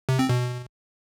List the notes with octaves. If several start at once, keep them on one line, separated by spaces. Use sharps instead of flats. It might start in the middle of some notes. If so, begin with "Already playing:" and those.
C3
C4
B2